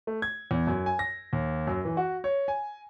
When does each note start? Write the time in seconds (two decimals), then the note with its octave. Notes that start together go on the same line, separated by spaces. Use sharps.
0.07 A3
0.22 G#6
0.51 E2
0.67 F#2
0.86 G#5
0.99 A#6
1.33 D#2
1.67 F#2
1.85 E3
1.97 F#4
2.24 C#5
2.48 G#5